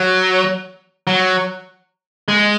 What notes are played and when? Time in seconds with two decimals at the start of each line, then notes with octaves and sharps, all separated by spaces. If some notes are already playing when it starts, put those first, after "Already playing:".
Already playing: F#3
1.07 F#3
2.28 G#3